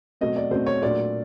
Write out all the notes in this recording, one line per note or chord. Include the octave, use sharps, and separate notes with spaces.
B2 F#3 A3 C4 D#5
D5
B2 F#3 A3 C4 C5
C#5
A#2 F#3 A3 D4 D5